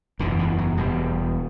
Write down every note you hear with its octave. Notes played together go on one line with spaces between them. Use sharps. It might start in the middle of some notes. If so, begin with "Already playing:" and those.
F#1 E2 B2 D3
E3
F#3
E1 E2 B2 G3